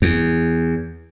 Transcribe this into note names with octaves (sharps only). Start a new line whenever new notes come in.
E2